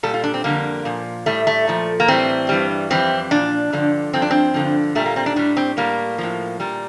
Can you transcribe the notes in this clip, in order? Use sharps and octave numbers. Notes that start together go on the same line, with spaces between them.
A#2 G3 A4
F4
D4
C4
F2 D3 G3 A#3
A#2 F3
A2 G3 A3
A3
A#2 F3
A#3
A2 E3 G3 C4
G2 E3 G3
F2 E3 G3 C4
A#2 F3 D4
G2 D3 F3
G2 F3 C4
D4
C4
G2 D3 F3
A#2 G3 A3
A#3
C4
D4
A2 G3 D4
C4
A2 G3 A#3
A2 F3
A#2 G3